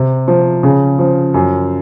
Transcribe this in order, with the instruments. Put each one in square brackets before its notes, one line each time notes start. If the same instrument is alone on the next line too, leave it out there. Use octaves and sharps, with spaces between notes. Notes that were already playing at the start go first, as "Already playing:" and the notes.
Already playing: [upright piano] C3
F3
C#3
F3
F#2